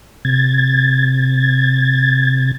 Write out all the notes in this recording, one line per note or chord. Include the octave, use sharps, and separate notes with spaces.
C3 G#6 A6